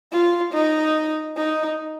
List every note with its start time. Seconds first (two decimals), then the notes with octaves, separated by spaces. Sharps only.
0.12 F4
0.53 D#4
1.37 D#4